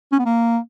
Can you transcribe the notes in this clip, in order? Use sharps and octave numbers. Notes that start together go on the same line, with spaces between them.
C#4
B3
A#3